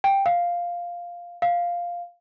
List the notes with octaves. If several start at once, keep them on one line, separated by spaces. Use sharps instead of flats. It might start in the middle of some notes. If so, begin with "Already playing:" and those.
G5
F5
F5